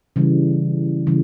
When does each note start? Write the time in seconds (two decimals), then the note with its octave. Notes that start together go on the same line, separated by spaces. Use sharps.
0.16 C#3 E3 G3
1.07 C#3 E3 G3